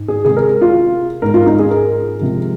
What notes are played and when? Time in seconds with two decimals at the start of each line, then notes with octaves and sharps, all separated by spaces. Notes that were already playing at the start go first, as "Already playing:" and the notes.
Already playing: G#2
0.08 G#4
0.25 C3 G#3 G#4
0.37 A#4
0.61 F4
1.22 G#2 G#3 A#4
1.34 F4
1.46 D#4
1.59 G#4
1.70 A#4
2.19 C3 F3 G#3